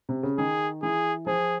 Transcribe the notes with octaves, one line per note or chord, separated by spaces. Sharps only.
C3
C#3
D#3 G#4
E3 G#4
F3 G#4